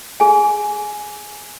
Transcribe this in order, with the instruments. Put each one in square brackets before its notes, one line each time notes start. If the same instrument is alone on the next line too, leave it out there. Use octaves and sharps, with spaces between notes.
[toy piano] G#4 G#5